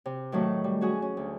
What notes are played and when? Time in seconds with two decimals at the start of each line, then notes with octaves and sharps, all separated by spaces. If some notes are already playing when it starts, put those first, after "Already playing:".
0.06 C3
0.32 A2 D#3 F#3 A3
0.64 G3
0.81 C#4 F#4 G#4
1.02 C#4
1.17 D2